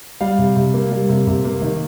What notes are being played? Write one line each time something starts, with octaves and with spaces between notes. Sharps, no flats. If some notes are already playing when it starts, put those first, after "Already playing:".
G3 F5
C3
C3
A#3
G3
C3
C3
A#3
D#3